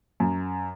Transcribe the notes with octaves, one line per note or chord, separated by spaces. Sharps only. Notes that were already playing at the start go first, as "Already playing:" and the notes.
F#2